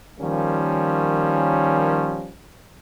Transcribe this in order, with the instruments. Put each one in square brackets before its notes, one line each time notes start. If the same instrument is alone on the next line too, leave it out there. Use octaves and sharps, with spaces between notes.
[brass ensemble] D#3 F3 G3 A#3 C#4